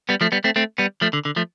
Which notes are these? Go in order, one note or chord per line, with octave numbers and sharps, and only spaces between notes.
G3 B3
F3 A3
G3 B3
A3 C4
A3 C4
G3 B3
F3 A3
D3
D3
F3 A3